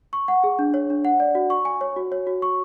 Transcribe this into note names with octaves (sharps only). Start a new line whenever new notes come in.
C#6
F#5
G#4
D4
C#5
D4
F#5
D5
F#4
C#6
G#5
C#5
F#4
C#5
F#4
C#6